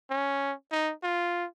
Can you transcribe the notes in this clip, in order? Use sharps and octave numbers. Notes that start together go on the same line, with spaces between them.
C#4
D#4
F4